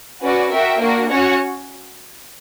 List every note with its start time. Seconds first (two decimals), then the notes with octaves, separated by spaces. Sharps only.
0.23 C#4 F#4 B4 D5
0.51 F#4 A#4 E5 G5
0.80 A#3 D4 F#4
1.09 C#4 F#4 C#5 F#5